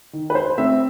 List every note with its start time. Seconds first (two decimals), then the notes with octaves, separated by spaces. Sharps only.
0.13 D#3
0.30 B4
0.35 C5
0.58 A3 C4 E5